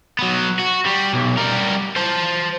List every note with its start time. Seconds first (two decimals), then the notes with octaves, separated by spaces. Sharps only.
0.19 F#3 B3
0.59 F#4
0.85 G3
1.13 B1
1.37 G3 A#4
1.96 C5 A5